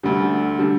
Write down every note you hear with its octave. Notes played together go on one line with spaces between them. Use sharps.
D2 D3 G3
D3 G3